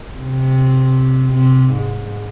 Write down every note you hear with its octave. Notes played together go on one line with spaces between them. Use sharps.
C3
C3
G#2